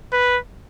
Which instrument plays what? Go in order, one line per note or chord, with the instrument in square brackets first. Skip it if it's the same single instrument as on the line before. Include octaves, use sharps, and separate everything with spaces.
[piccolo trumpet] B4